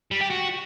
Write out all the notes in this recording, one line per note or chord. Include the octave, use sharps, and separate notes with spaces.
G3
G4
F#4